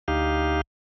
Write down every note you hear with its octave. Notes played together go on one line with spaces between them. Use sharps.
D2 D#4 G4 F5